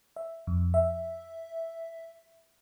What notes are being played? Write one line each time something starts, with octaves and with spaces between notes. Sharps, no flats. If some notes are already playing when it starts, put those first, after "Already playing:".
E5
F2
E5